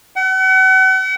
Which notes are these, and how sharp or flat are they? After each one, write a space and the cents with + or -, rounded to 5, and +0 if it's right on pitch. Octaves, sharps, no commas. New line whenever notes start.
F#5 +40